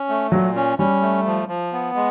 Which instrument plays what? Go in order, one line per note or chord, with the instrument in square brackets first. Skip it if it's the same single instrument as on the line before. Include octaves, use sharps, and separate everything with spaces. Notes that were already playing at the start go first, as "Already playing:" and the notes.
Already playing: [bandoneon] C#4
A3
[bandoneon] A#2 [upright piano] F#3
[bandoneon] C#4
[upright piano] G3 [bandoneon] C#4
[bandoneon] A3
F3
F3
B3
G#3